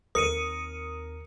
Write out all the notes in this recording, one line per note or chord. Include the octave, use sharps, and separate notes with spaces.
D#2 C4 A#4 D#6 C#7 D#7